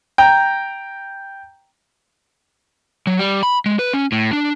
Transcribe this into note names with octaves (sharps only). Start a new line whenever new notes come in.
G5 A#5
F#3
G3
B5
G#3
B4
C#4
A2
D4